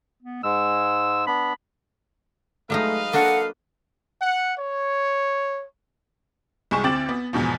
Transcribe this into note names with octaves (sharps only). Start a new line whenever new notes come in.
B3
G#2 G#3 E6
B3 D4 B5
F#3 G#3 A3 D#4 B4 D#5 F5
A#3 D4 F#4 A4 F#5
F#5
C#5
C2 G#3 G#5 C#6 E7
D2 C4 D6 A6 F#7
B3
E2 G#2 B2 F3